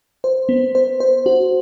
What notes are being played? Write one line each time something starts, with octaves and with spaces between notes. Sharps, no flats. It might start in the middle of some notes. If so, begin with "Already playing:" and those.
C5
B3
C5
C5
F#4